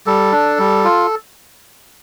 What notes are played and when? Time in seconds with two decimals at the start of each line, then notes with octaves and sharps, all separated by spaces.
0.07 G3 A4
0.32 D4
0.59 G3
0.84 F4